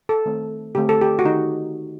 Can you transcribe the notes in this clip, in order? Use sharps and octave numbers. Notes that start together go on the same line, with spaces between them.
A4
D#3 A3 C4
D3 A3 C4 G4
A4
G4
F#4
D#3 D#4